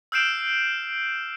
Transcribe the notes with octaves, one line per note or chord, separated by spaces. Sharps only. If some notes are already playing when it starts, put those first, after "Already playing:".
E6 F6 G6 C7 D7 E7